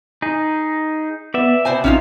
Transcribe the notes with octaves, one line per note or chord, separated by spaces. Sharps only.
D#4 G#4
B3 D5 E5
B2 C5 G#5
A#1 C#4 D#4 F4 F6